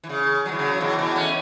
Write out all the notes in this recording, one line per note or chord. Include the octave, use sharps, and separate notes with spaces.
E3
C#3
F#3
E3
C#3 F#3
B2 E3
B2 E3
A3 C#4